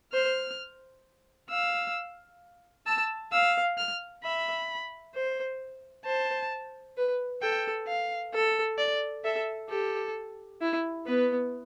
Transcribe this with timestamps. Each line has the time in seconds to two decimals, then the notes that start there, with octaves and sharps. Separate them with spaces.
0.13 C5 F6
1.50 F5 E6
2.86 A5 E6
3.32 F5 E6
3.78 F6
4.23 E5 B5
5.14 C5
6.05 C5 A5
6.97 B4
7.42 A4 G5
7.88 F5
8.34 A4
8.78 D5
9.24 A4 E5
9.69 G4 A4
10.62 E4
11.06 B3 B4